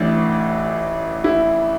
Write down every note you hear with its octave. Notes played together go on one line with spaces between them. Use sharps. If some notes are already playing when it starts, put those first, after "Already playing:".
Already playing: A1 A2 E3 D4
E4